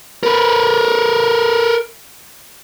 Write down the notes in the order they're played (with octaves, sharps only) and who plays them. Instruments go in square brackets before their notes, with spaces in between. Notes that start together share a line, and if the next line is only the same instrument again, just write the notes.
[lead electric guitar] A#4 B4